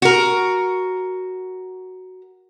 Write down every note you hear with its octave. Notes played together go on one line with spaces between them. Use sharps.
F#4 A#4